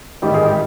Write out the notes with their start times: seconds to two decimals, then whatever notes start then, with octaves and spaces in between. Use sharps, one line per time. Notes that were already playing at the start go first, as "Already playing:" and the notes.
0.22 A1 G#2 D#3 G3 G4
0.34 G#3 G#4
0.46 G3 G4